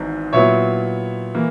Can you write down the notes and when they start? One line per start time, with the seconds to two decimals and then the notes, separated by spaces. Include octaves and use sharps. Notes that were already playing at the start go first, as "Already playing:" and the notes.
Already playing: G#1 G#2 E3 B3
0.33 A#2 F#3 B3 E4 C#5 E5
1.35 E3 A#3